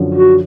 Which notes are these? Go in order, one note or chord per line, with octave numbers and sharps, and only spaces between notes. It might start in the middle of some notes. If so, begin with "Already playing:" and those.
Already playing: F#2 D3 F3
F#4